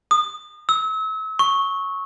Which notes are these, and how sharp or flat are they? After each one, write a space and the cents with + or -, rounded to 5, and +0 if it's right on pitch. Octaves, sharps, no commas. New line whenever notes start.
D#6 -30
E6 -35
C#6 -5